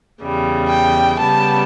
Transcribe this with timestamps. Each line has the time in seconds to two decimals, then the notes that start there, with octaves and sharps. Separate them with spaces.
0.22 E2 C#3 G3
0.70 G5
1.19 C#3 G3 B3 A5